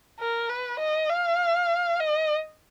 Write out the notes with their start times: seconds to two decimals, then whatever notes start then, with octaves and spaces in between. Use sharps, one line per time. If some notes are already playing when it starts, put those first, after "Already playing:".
0.19 A#4
0.49 B4
0.79 D#5
1.09 F5
2.00 D#5